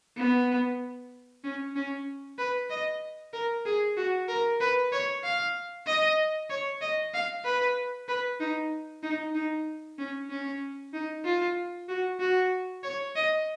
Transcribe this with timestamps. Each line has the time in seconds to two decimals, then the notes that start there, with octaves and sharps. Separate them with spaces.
0.17 B3
1.44 C#4
1.76 C#4
2.38 B4
2.70 D#5
3.33 A#4
3.66 G#4
3.97 F#4
4.29 A#4
4.60 B4
4.92 C#5
5.24 F5
5.87 D#5
6.50 C#5
6.81 D#5
7.14 F5
7.45 B4
8.09 B4
8.40 D#4
9.03 D#4
9.35 D#4
9.99 C#4
10.30 C#4
10.94 D#4
11.25 F4
11.89 F#4
12.20 F#4
12.84 C#5
13.16 D#5